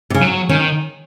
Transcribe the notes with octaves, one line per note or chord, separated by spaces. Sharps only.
C3
C#3
F#3
D#3 C#4